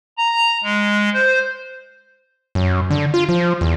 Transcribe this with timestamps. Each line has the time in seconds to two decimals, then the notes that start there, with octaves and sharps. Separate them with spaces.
0.18 A#5
0.63 G#3
1.14 C5
2.55 F#2
2.90 D3
3.14 F4
3.29 F3
3.61 E2